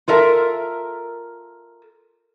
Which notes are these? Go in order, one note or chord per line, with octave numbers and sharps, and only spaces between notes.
F4 A4 A#4 E5 A5